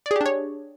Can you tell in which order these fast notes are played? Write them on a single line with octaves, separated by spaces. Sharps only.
D5 G#4 G4 D4 C#5